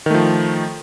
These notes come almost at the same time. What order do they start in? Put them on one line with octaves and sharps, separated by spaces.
D#3 A3 F3